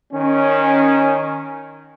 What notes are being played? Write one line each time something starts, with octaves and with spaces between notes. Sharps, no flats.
D#3 C#4